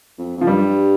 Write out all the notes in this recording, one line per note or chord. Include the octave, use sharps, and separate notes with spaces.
F2
F2 F3
G2 G3